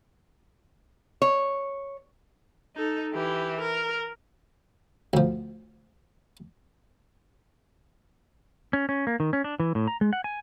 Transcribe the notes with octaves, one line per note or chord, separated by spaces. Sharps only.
C#5
D#4 A4
E3 G4
A#4
D2 F3
C#4
C#4
A#3
D#3
C#4
D4
E3
A2
A#5
G#3
F#5
G#5